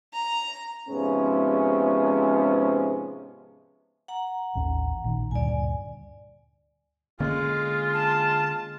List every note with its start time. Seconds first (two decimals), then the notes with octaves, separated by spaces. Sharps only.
0.13 A#5
0.89 G#2 C3 F3 G#3 B3 C#4
4.08 F#5 A#5
4.55 A1 D#2 C#4
5.04 A#1 D#3
5.31 D2 G2 A#2 D5 G#5
7.20 D3 G#3 A#3 C#4 F4
7.93 A5